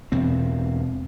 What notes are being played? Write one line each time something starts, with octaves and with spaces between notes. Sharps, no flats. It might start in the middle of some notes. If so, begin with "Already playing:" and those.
E2 B2 C4